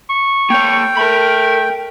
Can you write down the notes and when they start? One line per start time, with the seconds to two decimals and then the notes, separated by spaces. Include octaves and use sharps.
0.09 C#6
0.50 A#3 C#5 G5
0.97 A3 A#4 B5